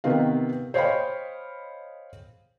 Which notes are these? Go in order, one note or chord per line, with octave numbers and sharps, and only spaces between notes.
C3 D#3 B3 F5
C5 C#5 D#5 F5 G5 B5